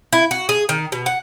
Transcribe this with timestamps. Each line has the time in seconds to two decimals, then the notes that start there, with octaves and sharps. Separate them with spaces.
0.13 E4
0.31 F#4
0.49 G#4
0.69 D#3
0.92 B2
1.06 F#5